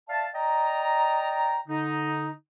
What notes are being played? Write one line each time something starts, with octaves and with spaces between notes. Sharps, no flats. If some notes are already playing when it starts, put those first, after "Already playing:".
D5 E5 F5 A5
D5 D#5 G5 A#5
D3 D#4